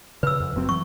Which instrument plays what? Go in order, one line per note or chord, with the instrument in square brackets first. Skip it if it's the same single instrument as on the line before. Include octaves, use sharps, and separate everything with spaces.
[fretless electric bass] C#3 [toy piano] B4 E6
[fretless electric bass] F2
F#1 F#3 C4
[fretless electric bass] E3 F#3 [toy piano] C#6